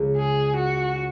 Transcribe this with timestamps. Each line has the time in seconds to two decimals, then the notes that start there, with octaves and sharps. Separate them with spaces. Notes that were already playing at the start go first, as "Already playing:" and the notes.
Already playing: C#2 C#3 G#3
0.17 G#4
0.57 F#4